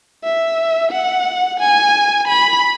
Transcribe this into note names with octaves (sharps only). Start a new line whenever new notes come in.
E5
F#5
G#5
B5